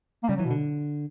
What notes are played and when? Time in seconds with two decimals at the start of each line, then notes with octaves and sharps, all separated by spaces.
0.23 A#3
0.29 C#3 G3
0.36 E3 F#3
0.45 B2
0.51 D3